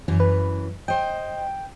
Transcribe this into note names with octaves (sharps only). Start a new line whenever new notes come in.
F#2 E3
B4
C5 D#5 G5